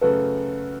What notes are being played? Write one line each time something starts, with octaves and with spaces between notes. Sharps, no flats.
F#2 C#3 A3 F#4 A4 B4